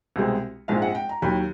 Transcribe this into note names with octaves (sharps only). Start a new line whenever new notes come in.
C2 B2 G#3 C4
A#1 G#2 F3 G#3 C4 F5
F#5
G5
A#5
D#2 D#3 F#3 B5